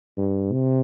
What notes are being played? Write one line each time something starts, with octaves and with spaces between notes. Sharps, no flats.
G2
C3